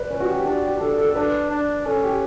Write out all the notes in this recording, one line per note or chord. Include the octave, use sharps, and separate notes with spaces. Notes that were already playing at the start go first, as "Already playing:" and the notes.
Already playing: B4 D5
C#4 B4
F#4
G4
G4
D4 F#4
G4
D4 A4
A4
A4
D4 B4
D4
C#4 A4
G4